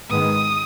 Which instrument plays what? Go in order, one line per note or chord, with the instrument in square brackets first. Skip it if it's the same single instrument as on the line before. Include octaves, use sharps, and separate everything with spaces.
[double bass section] G#2 D#3 G#3 B3 [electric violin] D#6